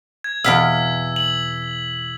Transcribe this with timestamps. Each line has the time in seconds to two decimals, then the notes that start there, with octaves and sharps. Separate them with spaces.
0.24 G#6
0.44 E2 B2 F5 E6 B6
1.16 F#7